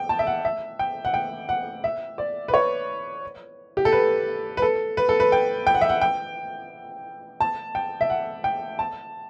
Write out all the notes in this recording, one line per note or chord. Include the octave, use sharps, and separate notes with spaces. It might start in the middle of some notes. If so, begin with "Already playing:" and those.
Already playing: G5
A5
E5
F#5
E5
G5
F#5
G5
F#5
E5
D5
B4
C#5
G4
A4
B4
B4
A4
B4
A4
B4
G5
G5
F#5
E5
F#5
G5
A5
G5
E5
F#5
G5
A5